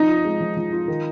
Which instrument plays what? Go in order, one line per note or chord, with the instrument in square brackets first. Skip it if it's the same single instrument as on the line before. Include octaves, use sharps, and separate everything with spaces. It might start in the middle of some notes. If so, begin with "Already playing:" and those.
Already playing: [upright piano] F3 [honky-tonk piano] D#4
[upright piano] F4
G#3
F3
F3
F4
D#3